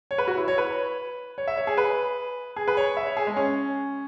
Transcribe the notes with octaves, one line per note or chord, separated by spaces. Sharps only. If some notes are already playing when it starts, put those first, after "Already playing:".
C#5
B4
F#4
E4
C#5
B4
C#5
E5
C#5
G#4
B4
G#4
B4
C#5
E5
C#5
G#4
G#3
C#4